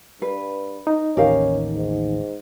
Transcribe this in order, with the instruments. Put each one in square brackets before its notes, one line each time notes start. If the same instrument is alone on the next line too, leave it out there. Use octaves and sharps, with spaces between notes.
[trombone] G2 [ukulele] B4
[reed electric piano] D#4
[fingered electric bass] A1 D#2 D#3 [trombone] C#4 [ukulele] G4 A#4 F5
[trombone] G#2